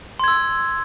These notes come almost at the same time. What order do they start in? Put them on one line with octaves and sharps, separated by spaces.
C6 G#6 E6